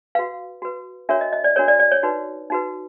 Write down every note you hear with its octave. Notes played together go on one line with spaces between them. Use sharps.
F#4 B4 F5
F#4 B4
D4 F#4 A#4 C#5 E5
D#5
D#5
D5
D4 F#4 A#4 C#5
D5
D5
C#5
D#4 F#4 B4
D#4 F#4 B4